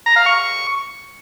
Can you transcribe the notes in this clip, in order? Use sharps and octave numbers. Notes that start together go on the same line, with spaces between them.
A#5
F5
C#6